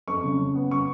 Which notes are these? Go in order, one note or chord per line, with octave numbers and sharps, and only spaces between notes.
F2 C#6
C#3
C#3
B3
C#3 C#6